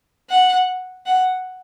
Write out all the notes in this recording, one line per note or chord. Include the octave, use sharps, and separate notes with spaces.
F#5
F#5